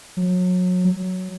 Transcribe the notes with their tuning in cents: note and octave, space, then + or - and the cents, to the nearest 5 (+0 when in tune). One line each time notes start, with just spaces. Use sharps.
F#3 -30
F#3 +5